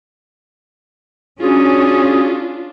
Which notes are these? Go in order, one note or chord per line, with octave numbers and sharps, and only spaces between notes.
C#4 D4 F4 F#4 G#4